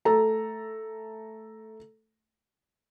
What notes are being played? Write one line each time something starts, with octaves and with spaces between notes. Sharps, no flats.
A3 A4 A#5